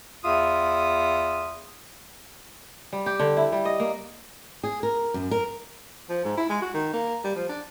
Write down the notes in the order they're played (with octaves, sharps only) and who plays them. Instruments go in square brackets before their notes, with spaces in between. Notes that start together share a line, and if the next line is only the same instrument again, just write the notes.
[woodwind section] E2 F4 E5 D#6
[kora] G3
G4
D3
E4
G3
D#5
A#3
[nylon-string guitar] G#4
A#4
F#2
A#4
[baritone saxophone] F3
G#2
E4
G#3
F#4
D#3
A#3
G3
F3
D4